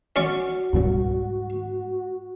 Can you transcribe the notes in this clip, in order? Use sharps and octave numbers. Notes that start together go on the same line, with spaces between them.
C#4 F#4 D5 C#6
C#2 G#2 B2 G3